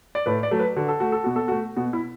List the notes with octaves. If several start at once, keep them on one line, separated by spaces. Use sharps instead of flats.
D5
A2 B4
D5
F#3 A3
B4
D3 F#4
A4
A3 F#4
A4
B2 F#4
A4
F#4
A3
B2 F#4
E4